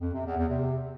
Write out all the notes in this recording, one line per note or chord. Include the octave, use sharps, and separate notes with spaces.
F2
C3
E2
E2
C3